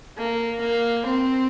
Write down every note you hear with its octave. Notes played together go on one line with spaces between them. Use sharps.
A#3
A#3
C4